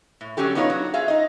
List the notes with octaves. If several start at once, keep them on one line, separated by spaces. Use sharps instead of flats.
A2
D3 F#3 C#4 G4 A4
B3 D4 D#4 F4 C5 C#5
F#3
F4 G#4 E5 F5
D#4 D#5